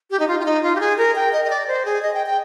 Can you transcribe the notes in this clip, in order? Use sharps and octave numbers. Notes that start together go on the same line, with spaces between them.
G4
D#4
F4
F4
D#4
F4
G4
G#4
A#4
G5
D#5
D#5
D5
C5
G#4
D#5
G5
G5